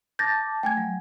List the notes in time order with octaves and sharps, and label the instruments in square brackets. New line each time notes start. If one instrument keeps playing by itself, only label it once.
[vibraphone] A5 D6 [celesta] G6 A6 A#6
[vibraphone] A3 [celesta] G5 G#5 G#6
[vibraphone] F#3